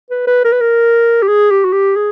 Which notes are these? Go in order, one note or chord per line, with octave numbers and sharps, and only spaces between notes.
B4
B4
A#4
B4
A#4
G4
G#4
G4
F#4
G4
G#4